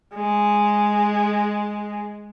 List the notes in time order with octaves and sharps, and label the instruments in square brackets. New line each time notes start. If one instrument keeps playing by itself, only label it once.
[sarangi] G#3